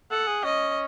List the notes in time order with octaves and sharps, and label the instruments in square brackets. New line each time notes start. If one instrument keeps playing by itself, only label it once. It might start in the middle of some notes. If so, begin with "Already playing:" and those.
[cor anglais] A4 [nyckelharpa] F#5
[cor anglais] G#4
[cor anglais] C#4 [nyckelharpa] D#5